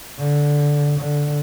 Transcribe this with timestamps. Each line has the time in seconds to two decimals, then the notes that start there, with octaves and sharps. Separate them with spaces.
0.18 D3
0.98 D3